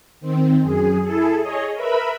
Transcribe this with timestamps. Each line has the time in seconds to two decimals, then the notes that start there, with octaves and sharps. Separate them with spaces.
0.21 D#3 C4
0.62 F#2 G#4
1.03 E4 G#4 A4
1.41 G#4 C#5 D#5
1.74 A#4 B4 E5 B5